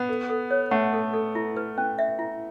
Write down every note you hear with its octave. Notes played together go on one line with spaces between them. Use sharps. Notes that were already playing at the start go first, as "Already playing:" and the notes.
Already playing: B3 F#5
A4
A4
C#5
A3 F#5
A4
A4
E4
B4
C#4
E5
E4